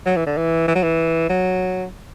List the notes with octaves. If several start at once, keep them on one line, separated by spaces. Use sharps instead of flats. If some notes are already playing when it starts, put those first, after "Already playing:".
F#3
E3
D3
E3
E3
F#3
E3
F#3